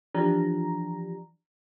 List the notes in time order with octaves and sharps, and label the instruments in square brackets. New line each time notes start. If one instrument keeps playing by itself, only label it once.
[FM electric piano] E3 F3 D4 G4 A#5